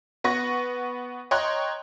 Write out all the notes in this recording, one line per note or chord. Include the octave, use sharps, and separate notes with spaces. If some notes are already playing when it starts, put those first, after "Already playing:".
B3 B4 F#5 C#6 A#6
C#5 D#5 G5 A#5 C6 F#6